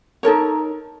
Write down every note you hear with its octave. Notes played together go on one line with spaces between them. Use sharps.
D#4 A4 A#4 C#5